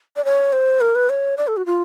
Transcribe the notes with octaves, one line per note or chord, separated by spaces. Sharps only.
D5
C#5
C5
A#4
B4
C#5
D5
A4
F#4
F4